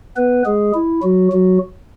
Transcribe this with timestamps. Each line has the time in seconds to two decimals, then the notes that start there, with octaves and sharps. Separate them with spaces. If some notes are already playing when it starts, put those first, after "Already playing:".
0.17 B3 B4
0.46 G#3 G#4
0.74 E4
1.03 F#3 F#4
1.32 F#3 F#4